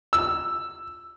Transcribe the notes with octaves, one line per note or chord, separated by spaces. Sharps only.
E6